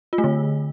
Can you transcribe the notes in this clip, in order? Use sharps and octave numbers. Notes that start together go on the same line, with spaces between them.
F4
A3
D3